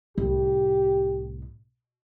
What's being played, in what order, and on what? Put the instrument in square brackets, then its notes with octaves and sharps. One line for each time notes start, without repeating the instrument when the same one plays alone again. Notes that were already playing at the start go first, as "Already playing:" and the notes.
[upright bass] C2 A2 [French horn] G4